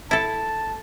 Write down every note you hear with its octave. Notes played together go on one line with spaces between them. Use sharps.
E4 A4 A5